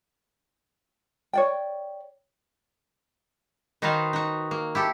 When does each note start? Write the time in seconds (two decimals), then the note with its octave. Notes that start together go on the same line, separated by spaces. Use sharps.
1.33 C#5 D5 G5
3.82 D#3 D#4 F#4 B4 C5 F5
4.13 D#4 F#4
4.51 A#3
4.75 E4 G4 A4